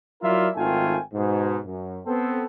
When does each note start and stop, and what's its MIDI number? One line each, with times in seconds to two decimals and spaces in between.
0.22 0.47 54
0.22 0.47 64
0.22 0.47 65
0.22 0.47 70
0.22 0.47 74
0.22 0.47 76
0.56 0.97 32
0.56 0.97 51
0.56 0.97 57
0.56 0.97 65
0.56 0.97 79
0.56 0.97 80
1.14 1.58 44
1.14 1.58 47
1.64 1.99 42
2.05 2.44 59
2.05 2.44 60
2.05 2.44 69